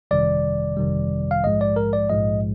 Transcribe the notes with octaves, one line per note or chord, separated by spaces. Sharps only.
G1 F2 C3 D#3 G3 D5
G1 F2 C3 D#3 G3
F5
A#1 G#2 F3 G#3 D#5
D5
A#4
D5
A#1 G#2 F3 G#3 D#5